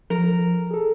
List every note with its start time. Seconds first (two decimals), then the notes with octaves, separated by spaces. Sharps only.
0.10 F3 A#4
0.71 G#4 A4